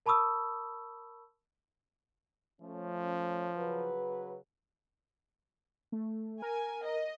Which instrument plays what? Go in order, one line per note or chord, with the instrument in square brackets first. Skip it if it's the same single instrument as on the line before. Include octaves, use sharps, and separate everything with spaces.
[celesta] A#4 A5 B5 C#6 D#6 E6
[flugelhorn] F3 [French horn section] A3 C#4
[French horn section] C#3 F#3 B4
[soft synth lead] A3
[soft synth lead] A#4 [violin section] G#5
[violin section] D#5